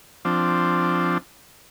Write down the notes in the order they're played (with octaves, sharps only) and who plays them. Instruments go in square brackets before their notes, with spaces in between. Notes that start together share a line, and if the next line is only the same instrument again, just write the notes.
[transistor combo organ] F3 C4 D4